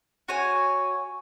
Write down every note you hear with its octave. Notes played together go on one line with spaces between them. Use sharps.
F#4 C#5 G#5